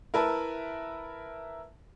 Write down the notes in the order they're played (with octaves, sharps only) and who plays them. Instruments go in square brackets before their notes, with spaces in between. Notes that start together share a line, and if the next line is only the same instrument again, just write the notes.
[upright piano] E4 A#4 B4 E5 A5